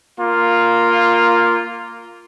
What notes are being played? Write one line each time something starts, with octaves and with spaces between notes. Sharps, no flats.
A#3 F4